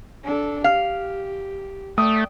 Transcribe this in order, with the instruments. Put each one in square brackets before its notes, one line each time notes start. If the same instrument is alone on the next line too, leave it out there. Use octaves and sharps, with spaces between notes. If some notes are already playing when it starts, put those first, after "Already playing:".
[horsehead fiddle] D4 A4
[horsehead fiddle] G4 [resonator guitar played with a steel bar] F5
[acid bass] A3 [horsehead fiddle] D5 G5 [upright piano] D#6